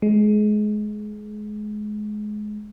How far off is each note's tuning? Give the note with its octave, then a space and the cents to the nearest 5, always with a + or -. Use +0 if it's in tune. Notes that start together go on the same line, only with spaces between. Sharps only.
G#3 +25